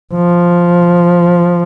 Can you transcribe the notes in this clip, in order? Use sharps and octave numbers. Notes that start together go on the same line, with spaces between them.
F3